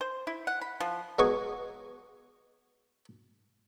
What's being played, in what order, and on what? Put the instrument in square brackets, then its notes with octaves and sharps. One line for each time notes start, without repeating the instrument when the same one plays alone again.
[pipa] C5
E4
F#5
B5
F3
[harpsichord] F#3 G#3 B3 F#4 G#5 C#6